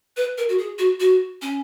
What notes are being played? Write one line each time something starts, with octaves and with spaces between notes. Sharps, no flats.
B4
A#4
F#4
G#4
F#4
F#4
C#4